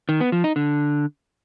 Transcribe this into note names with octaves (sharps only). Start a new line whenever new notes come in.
D#3
B3
F3
D#4
D3